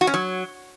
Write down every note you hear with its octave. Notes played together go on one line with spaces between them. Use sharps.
F#4
C#4
F#3